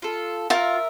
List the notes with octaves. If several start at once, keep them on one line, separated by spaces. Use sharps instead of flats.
F4 A4
F4 A#4 E5